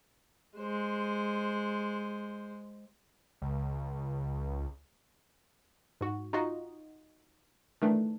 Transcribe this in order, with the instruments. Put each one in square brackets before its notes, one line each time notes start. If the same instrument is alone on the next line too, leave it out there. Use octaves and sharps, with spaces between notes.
[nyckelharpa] G#3 C5
[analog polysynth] C#2
[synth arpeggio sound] G#2 F#4
D#4 F4 F#4 D#5
D#3 E3 A3 D4